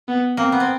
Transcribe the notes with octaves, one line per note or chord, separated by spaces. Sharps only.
B3
A#3 C4
B3
C4